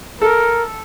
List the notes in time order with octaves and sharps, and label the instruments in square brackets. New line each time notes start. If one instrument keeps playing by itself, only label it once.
[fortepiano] A4 [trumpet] A#4